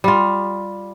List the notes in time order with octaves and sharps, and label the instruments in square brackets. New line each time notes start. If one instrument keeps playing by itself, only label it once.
[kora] G3 F4